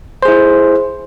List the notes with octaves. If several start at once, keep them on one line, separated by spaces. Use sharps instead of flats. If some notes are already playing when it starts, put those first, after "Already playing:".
E4 G#4 C5